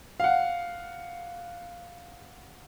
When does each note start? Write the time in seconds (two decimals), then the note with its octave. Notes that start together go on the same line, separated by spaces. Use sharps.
0.20 F5 F#5